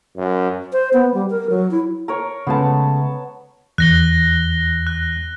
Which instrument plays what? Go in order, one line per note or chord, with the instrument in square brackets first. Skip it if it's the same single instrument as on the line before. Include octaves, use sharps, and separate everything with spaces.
[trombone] F#2
[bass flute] C5
B3
G3
A#4
F#3
E4
[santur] A#4 C#5
[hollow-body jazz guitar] C#3 G#3 A3 [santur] B3 A5
[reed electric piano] E2 [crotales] F#6 A#6 G7
[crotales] F#6